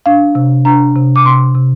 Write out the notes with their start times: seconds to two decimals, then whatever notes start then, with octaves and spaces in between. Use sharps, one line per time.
0.06 D4 F5
0.35 C3
0.65 D4 A#5
0.96 C3
1.16 D6
1.25 C3 C6
1.55 C3